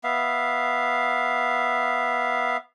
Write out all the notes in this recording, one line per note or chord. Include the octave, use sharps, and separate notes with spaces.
B3 E5 F5